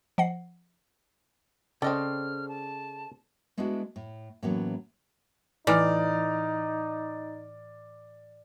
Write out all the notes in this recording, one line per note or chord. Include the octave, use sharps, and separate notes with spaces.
F3 D#5 F#5 C7
C#3 C4 A4 D5 D#5 G5 F6
A5
G#3 A3 B3 D4 E4 F#4
A2
A2 E3 F#3 A#3 B3 C#4
A2 E3 D#4 D5 D6 F6